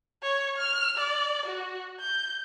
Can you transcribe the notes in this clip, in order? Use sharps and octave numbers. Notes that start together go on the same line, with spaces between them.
C#5
F6
D5
F#4
G6